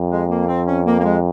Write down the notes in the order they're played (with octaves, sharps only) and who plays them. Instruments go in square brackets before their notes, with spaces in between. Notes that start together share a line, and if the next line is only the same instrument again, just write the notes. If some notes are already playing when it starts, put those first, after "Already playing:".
Already playing: [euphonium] F2
[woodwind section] G#3
A#3
C4
C#4
A#3
A#3
G#3